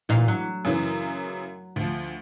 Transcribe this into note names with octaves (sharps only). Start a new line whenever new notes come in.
D2 A#2 E3 F5
F#3
F#2 C#3 E3
D2 F3